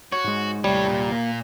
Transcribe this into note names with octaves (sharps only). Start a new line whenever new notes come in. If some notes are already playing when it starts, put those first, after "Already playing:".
F#4 C#5
G#2 G#3
D#2 A2 C3 G3 C#5
A#2
A#3